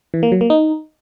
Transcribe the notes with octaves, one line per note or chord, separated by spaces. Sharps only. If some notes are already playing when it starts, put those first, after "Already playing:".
E3
A#3
F#3
A#3
D#4